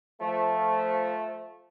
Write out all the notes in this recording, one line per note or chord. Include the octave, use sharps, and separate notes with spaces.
F3 A3